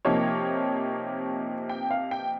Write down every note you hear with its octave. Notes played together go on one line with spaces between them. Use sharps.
C3 F3 A#3 D#4 C#5
G5
F5
G5